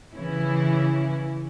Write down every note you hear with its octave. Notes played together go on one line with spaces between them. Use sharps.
C#3 E3 C#4 E4